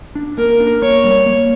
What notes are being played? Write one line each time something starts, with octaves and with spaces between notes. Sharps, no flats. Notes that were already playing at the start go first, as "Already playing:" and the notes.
D4
A#3 A#4
D4
A#3 C#5
G3
A#3